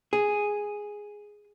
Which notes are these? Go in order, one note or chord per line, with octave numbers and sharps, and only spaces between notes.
G#4